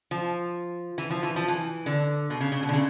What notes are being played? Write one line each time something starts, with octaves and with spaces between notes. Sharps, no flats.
F3
E3
F3
E3
F3
E3
D3
B2
C#3
C#3
B2
D3
C#3